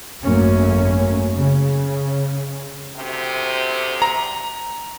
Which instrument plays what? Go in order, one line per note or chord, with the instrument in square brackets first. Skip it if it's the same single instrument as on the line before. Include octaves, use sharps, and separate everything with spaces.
[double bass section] G#1 F#2 A3 A#3 C#4
C#3
[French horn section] D2 C3
[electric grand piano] A#5